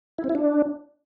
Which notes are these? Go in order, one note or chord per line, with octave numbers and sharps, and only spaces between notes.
E4
C4
E4
D4